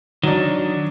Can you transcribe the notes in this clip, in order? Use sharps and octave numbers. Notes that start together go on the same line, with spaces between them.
D#3 F#3 D4